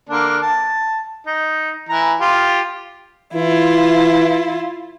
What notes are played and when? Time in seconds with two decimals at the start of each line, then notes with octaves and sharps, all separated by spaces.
0.09 D3 A#3 D4
0.42 A5
1.27 D#4
1.89 E3 A#5
2.21 F4 G4
3.34 E3 E4 F4